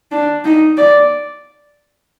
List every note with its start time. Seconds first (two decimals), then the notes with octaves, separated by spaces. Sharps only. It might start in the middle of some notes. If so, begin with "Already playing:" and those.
0.11 D4
0.45 D#4
0.77 D5